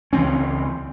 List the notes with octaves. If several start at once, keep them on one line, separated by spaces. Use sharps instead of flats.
C#2 E3 C4 C#4